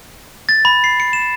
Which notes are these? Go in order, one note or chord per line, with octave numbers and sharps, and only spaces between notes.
A6
B5
C7
C#7
E7